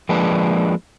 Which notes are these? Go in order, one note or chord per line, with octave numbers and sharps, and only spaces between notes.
F3 G#3 A#3 D4 B4